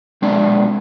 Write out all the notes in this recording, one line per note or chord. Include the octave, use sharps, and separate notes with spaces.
B1 G#3 C4 D4 D5